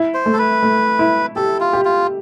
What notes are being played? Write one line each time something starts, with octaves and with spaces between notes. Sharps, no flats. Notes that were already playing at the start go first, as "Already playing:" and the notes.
Already playing: E4
C5
A3
A4
B4
A3
E4
G4 A4
F4
G4
F4